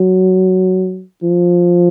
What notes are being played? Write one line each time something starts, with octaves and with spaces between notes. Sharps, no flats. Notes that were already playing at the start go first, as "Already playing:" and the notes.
Already playing: F#3
F3